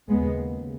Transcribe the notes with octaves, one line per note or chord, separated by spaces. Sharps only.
D#2 C#3 G#3 B3